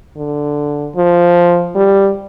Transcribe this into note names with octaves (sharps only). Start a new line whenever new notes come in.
D3
F3
G3